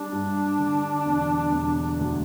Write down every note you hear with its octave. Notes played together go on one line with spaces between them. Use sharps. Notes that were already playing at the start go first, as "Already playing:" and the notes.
Already playing: G3 D4
G2
D3
E1
E1
D2